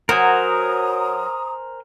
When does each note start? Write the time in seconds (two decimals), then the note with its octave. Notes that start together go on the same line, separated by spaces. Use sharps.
0.09 F#3 A#4 C5 G#5 A#5 D#6